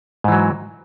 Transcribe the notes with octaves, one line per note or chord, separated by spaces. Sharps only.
G#2 E3 F#3